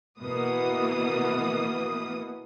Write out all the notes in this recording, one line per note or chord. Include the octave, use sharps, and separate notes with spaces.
B2 E3 A#3 B3 D#6